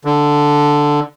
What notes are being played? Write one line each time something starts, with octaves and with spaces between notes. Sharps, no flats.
D3